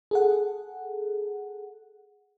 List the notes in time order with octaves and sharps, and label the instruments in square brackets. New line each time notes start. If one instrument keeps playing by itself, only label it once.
[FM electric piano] G#4 A4 F#5